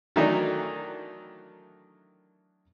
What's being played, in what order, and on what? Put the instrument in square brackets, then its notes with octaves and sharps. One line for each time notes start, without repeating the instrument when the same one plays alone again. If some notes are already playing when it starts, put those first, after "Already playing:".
[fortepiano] D#3 E3 F#3 A3 D4 D#4